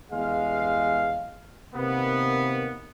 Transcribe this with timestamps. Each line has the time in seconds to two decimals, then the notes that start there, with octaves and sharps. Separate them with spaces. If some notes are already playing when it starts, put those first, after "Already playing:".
0.12 E2 G2 G#3 F5
1.75 C3 D#3 A#3 B3